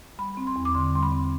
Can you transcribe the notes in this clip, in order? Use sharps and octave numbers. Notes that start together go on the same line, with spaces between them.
G3 B5
C4 B5
C6
E2
D6
D3 C6
G3 C6
B5
C4